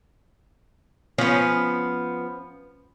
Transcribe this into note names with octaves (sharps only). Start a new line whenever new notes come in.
F3 B3 C#4